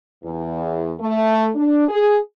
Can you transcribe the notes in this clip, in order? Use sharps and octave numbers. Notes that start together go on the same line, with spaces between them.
E2
A3
D4
G#4